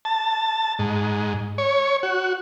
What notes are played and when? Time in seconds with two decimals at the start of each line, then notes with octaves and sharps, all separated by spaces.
0.05 A5
0.79 G#2
1.58 C#5
2.03 F#4